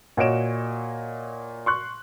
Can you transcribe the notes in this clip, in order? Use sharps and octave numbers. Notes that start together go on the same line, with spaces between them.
A#2 F#4 C#5 D#5 D7 E7
C6 C#6 F#6